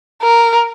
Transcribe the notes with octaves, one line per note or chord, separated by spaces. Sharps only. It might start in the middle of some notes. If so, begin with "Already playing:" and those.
A#4